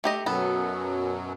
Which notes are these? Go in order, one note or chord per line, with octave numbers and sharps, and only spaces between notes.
A3 G4 D#5
F#2 B2 F#3 B3 A4